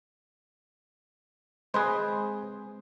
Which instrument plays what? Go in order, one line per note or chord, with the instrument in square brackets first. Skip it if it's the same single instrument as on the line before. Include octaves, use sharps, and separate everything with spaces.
[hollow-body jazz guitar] G#3 C4 C6 [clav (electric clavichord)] G#4 B4 C5